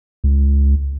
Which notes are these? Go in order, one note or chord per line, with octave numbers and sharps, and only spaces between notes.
C#2